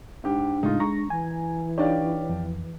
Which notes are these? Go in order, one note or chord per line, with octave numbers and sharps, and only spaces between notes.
G#2 D4 G4
A2 C#3 G#3 D#4 F4
G#3 A#5 C#6 A#6
E3 G#5
D4 D#4 G4 C#5 D5 F5
F2